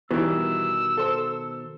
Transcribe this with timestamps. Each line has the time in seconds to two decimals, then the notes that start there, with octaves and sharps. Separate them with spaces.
0.11 B2 D#3 E3 G3 E6
0.97 A4 C5